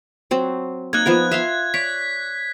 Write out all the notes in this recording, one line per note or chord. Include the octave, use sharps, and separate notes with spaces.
F#3 C4
A#3 D#4 F#6 G#6
F3 B3 A#4
E5 F5 C6
C#5 D5 B6